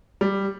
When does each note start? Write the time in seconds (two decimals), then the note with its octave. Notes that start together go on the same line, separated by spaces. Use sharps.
0.21 G3